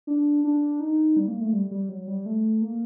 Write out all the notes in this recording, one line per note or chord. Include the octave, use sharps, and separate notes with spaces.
D4
D4
D#4
G3
A#3
A3
G3
G3
F#3
G3
A3
A#3